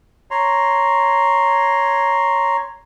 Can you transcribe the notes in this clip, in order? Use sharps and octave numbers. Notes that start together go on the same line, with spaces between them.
C#5 A#5 C6